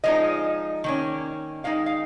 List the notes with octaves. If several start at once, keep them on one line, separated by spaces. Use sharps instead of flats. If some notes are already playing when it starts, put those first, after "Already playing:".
F3 G#3 D#4 D#5
D#3 A#3 C#4
D#3 G#3 D#4 F5
F5